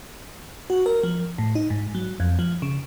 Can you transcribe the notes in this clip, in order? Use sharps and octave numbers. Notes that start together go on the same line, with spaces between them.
F#4
A#4
F3
A2
D#4
G#2
F#3
F2
F3
C#3